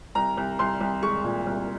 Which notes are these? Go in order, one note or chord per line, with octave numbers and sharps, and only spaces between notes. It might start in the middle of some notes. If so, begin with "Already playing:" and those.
C2 A#5
C2
C2 C6
C2
G#3 C#6
A#2
C2